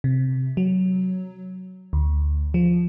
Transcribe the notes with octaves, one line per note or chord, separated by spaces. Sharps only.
C3
F#3
D2
F3